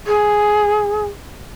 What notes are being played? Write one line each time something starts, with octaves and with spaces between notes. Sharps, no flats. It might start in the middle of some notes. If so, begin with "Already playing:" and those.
G#4